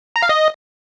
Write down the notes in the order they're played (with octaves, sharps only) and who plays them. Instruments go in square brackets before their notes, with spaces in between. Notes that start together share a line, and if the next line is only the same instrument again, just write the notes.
[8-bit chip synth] A#5
F5
D#5